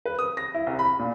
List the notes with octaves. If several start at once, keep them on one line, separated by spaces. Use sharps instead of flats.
B4
D#6
A#6
E4
C2
B5
A#2